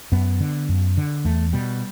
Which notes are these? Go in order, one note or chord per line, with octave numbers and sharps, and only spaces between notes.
F#2 B3
D3
F#2
D3
E2 A3
B2 G3